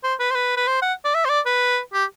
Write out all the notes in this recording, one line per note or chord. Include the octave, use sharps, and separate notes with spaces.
C5
B4
C5
B4
B4
C5
F#5
D5
E5
C5
D5
B4
G4